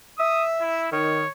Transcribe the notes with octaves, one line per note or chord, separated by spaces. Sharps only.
E5 D#6
E4
D#3 C#5